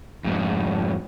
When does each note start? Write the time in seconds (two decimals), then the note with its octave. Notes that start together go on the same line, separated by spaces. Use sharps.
0.24 F2 G#2